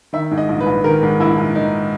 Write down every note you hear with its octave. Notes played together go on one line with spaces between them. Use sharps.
D#3 E5
G#2
D#5
A#1
B4
A#1
D#3 A#4
G#2
A#1 E4
A#1
D#3 D#4